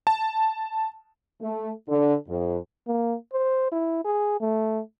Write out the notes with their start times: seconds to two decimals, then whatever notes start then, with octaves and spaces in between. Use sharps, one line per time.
0.07 A5
1.42 A3
1.88 D3
2.29 F2
2.87 A#3
3.33 C5
3.72 E4
4.05 G#4
4.40 A3